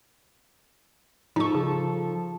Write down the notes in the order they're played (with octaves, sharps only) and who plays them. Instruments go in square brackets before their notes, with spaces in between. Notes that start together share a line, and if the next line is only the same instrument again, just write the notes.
[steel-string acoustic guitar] F3 A4 [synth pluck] D#4 C#6
[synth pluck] C#3